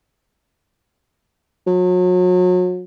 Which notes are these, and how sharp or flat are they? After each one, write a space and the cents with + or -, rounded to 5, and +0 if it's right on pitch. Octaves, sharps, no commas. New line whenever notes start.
F#3 -35